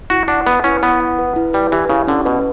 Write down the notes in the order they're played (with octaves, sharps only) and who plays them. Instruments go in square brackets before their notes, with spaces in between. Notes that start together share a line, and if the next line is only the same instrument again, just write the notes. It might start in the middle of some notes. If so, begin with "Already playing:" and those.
[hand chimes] E4 [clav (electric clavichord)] F#4
[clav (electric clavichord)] D4 [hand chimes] F#5
[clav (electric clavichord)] B3 [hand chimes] B4
[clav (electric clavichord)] C#4 [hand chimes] E4
[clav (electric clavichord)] B3 [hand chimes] E4
[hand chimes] F#5
B4
E4
[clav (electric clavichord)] G3 [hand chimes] B4
[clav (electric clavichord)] E3 [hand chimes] G4
[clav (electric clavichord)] C#3 [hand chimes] E4
[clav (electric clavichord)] D3 [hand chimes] C#4
[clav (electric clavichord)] B2 [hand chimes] B4